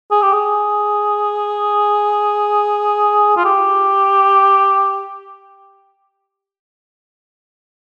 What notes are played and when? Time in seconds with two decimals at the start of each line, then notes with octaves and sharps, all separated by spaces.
0.11 G#4
0.22 G4
0.33 G#4
3.37 F4
3.45 G4